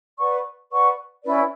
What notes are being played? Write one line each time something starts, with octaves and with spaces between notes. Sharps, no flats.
B4 D5 F#5 C#6
B4 D5 F#5 C#6
C#4 E4 B4 D5